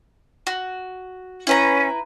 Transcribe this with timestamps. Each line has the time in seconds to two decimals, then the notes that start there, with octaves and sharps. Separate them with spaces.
0.47 F#4
1.47 C#4 E4 B4 A#5